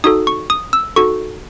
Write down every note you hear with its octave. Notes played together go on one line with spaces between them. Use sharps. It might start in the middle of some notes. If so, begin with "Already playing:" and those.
D#4 F#4 A4 D#6
C#6
D#6
E6
D#4 F#4 A4 C#6